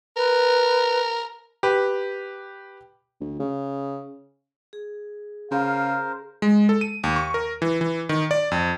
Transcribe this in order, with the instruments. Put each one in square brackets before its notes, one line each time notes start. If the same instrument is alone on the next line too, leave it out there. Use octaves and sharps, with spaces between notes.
[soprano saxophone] A#4 [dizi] B4
[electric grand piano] G4 B4
[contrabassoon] D2
C#3
[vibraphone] G#4
[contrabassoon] C#3 [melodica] A#4 C5 [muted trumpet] F5
[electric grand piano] G#3
A4
D#7
D#2
C#6
A#4
E3
E3
D#3
D5
F2